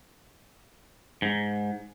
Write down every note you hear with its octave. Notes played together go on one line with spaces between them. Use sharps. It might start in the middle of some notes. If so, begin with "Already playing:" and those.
G#2